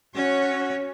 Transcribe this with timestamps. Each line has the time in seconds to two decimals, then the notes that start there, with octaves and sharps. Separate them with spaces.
0.14 C#4 F#4 C#5